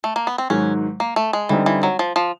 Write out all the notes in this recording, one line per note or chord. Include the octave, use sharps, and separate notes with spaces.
A3
A#3
B3
C4
G#2 D#3 F#3 C#4
A#3
A3
G#3
D3 E3 G3 C4 D#4
E3
F#3
F3
F3